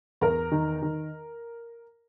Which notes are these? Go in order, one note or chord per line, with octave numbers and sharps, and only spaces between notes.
E2 A#4 A#5
D#3
D#3